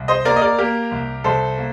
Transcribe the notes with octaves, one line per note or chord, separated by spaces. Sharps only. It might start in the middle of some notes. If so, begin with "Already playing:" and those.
Already playing: C2
C5 D#5
A#3 A#4 D5
D#5
A#4 D5
A#3 G4 A#4
C2
C2 A4 C5
A#3